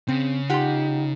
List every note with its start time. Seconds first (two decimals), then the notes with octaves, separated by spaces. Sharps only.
0.08 C#3 C4
0.50 D#4 F4 G4 F#5 C6